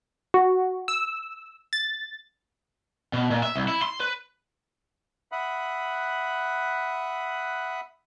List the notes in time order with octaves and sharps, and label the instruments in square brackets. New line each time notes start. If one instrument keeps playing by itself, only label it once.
[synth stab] F#4
E6
A6
[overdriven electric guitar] B2
A#2
E5
C2
E4
C6
B4
[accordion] E5 F#5 B5 D#6 F#6